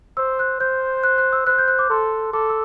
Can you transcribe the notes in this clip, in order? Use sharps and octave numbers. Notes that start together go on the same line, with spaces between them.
C5 E6
F#6
C5 G6
F#6
F#6
E6
C5 F#6
G6
F#6
D6
A4 C6
A4 D6
E6